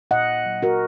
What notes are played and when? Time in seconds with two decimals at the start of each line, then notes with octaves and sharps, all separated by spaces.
0.11 A#2 D#5 F#5
0.46 F#3
0.63 F#4 A#4